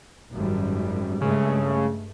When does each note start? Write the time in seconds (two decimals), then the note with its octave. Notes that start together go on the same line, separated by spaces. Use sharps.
0.33 G#1 F#2 G3
1.21 G2 C#3 G#3 A3